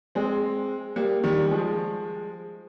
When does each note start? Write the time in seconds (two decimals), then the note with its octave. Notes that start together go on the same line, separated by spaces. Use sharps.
0.15 G#3 C4
0.96 G3 A#3
1.24 D#3 G3
1.46 G3
1.51 F3 G#3